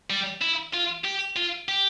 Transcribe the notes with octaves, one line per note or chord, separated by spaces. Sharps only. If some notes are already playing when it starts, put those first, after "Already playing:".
G3
E4
F4
G4
F4
G4